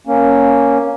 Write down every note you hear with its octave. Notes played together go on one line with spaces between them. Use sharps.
A#3 C#4